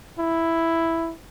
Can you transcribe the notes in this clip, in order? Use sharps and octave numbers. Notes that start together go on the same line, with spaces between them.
E4